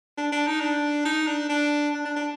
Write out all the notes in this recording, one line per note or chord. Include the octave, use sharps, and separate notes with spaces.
D4
D4
D#4
D4
D#4
D4
D4
D4
D4
D4